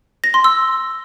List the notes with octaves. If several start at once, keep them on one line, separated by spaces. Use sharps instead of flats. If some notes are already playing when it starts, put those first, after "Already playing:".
A#6
C6
E6